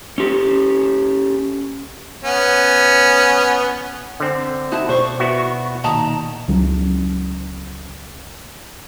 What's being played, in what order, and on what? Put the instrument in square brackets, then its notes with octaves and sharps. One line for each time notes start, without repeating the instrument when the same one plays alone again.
[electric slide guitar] C#4 G4 A4
[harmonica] B3 C#4
[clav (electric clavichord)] D3 C4
[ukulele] D#4 E4 F#4 [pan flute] A5
[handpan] B2 D5 [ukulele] C5 [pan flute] C#6
[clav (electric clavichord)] B3 E4 F#4
[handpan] A#2 D#3 [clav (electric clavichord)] D#5 [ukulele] A5 [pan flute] A#5
[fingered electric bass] C#2 F#3 C#4